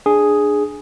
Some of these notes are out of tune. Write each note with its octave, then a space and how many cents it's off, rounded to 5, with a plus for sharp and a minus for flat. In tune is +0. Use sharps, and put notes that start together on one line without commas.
D4 +15 G#4 +0